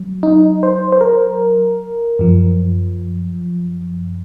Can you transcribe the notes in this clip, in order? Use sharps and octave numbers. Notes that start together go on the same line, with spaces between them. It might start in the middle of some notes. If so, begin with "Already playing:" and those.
Already playing: F#3
D#4
C5
C5
A#4
F#2 F3